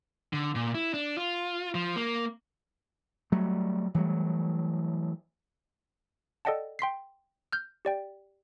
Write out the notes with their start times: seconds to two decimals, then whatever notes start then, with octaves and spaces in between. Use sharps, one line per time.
0.33 D3
0.55 A#2
0.75 E4
0.94 D4
1.18 F4
1.75 F3
1.96 A#3
3.32 F#3 G3 A3
3.94 E3 F#3 G3 A3
6.45 A4 D5 D#5 F#5 G5 A5
6.79 G5 C6 B6 C7
7.53 F6 G6
7.85 G4 D5 G5